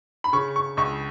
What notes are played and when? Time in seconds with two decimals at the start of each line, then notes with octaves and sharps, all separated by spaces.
0.24 B5
0.33 C#3 C#6
0.56 C#6
0.77 C#2 C#6